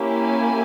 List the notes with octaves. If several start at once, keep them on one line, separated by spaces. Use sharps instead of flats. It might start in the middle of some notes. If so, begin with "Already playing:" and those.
Already playing: A#3 C#4 E4 G4
G#5